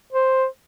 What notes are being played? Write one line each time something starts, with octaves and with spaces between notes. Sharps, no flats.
C5